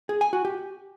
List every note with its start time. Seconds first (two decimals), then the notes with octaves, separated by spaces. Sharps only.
0.09 G#4
0.21 G#5
0.33 F#4
0.45 G4